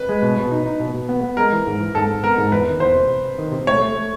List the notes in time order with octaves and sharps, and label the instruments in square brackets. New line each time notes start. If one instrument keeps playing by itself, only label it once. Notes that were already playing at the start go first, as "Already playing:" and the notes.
Already playing: [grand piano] B4
[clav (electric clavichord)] G#3
B2
B2
D#4
D#4
B2
B2
B3
B3
[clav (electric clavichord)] G#3 [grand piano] A#4
[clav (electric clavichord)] E3
G#2
E3
[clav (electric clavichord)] G#2 [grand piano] A4
[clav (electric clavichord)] G#2
[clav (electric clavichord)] B3 [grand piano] A#4
[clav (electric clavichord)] G#2
[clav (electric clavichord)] E2 [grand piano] B4
[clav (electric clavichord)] D#3
[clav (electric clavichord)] E2 [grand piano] C5
[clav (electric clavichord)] C3
C3
C3
D#3
C3
[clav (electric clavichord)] A3 [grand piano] C#5
[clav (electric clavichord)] A3
A3